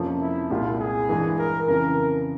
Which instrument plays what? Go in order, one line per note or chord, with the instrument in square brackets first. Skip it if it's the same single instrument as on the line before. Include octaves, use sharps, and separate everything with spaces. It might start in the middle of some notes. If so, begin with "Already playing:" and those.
Already playing: [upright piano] F2 C3 F3 A#3 C#4
[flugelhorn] E4
[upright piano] C2 A#2 G#3 E4 G4 [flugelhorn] F4
[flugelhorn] G#4
[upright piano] G2 E3 G#3
[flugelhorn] A#4
[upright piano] F2 C#3 E3 [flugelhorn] A#4